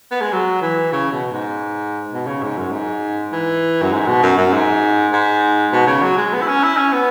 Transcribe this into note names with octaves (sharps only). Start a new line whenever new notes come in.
B3
G#3
F#3
E3
C#3
B2
G#2
B2
C#3
G#2
F#2
G#2
E3
F#2
G#2
B2
F#2
F#2
G#2
G#2
B2
C#3
F#3
G#3
B3
E4
C#4
E4
C#4
B3